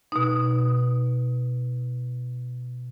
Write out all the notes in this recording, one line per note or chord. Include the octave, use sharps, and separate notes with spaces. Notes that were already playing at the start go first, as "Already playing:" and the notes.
B2 D#4